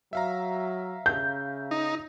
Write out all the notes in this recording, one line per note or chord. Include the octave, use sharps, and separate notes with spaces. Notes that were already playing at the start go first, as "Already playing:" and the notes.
F#3 E5 F5 A#5
C#3 G6
D#4